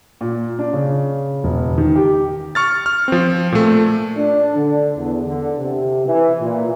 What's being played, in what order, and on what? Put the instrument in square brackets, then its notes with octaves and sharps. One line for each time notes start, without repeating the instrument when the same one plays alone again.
[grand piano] A#2
D4
C#3
E1
D#3
G4
[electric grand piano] C#6 F6 A6
F6
F3 C4
A#2 A3
[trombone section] D4
D3
E2
D3
C3
E3
A#2